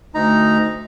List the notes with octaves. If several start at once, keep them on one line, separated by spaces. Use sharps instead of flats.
D2 D#4 A#5